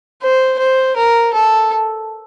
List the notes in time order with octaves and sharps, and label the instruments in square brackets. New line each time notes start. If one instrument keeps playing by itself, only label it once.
[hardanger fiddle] C5
C5
A#4
A4